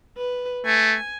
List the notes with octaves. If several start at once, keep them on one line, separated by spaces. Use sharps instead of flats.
B4
A3 G#5